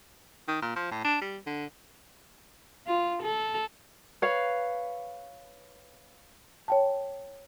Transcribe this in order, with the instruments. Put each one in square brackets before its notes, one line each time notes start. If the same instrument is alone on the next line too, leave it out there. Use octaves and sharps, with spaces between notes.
[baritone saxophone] D#3
A#2
F3
A2
D4
G3
D3
[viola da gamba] F4
A4
[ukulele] B4 C#5 F5
[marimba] C#5 G5 A5